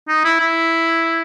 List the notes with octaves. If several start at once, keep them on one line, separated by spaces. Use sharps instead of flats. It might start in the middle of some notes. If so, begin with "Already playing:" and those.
D#4
E4
E4